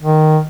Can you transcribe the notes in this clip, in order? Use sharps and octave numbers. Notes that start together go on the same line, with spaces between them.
D#3